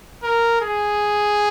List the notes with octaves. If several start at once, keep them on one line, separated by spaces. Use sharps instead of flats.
A#4
G#4